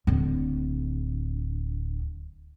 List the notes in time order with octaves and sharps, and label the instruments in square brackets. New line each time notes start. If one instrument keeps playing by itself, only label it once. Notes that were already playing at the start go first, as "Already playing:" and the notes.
[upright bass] D1 D3